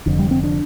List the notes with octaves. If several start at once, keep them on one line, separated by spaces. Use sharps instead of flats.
F1 F2 D3
G3
C4
D4